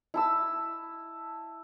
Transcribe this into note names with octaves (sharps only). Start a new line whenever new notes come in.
E4 A5 E6